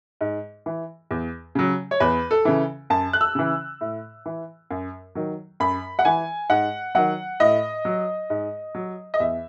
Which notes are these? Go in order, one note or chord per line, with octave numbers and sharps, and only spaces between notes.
G#2
E3
E2
C#3 F#3
C#5
E2 B4
A4
C#3 E3
F#2 A5
F#6
E6
C#3 E3
A2
E3
F#2
D#3 F#3
F#2 B5
F#5
E3 G#5
G#2 F#5
D#3 F#3 F#5
A2 D#5
F#3
G#2
F#3
D#5
E2 E5